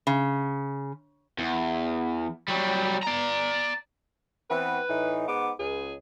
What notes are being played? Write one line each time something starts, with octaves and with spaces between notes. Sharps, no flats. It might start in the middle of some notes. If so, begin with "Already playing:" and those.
C#3
E2
F#3 G3
D5 A#5
E3 B3 C4 B4
A2 E3 D#4
G#2 B3 D6
C#2 G#4